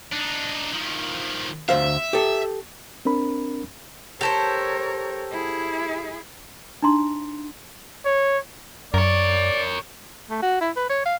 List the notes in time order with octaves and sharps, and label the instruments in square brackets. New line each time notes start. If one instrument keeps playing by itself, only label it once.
[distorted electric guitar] D4 D#4
D#3 F3
[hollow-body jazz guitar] D2 C5 F5 [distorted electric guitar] E5
[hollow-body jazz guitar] G4 A4
[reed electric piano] C4 D4 A#4 B5
[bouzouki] G4 A4 C5 [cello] A#4 C#5
[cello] E4 G#4
[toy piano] D4 D#4 A#5 C6
[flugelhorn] C#5
[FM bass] F#2 [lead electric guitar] A#4 C#5 [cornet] D5
[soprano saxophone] A3
F#4
E4
B4
C#5
F5